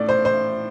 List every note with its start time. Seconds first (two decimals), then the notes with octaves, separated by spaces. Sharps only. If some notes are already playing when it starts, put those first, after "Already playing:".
Already playing: A2 D5
0.09 C5
0.25 C5